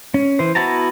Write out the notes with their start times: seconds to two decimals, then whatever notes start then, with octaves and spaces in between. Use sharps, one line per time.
0.14 C#4
0.39 E3 C5
0.55 B3 E4 F#4 A5 A#5